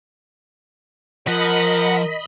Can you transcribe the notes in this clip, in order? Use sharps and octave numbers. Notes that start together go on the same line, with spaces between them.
F3 A#4 D#5 F#5 B5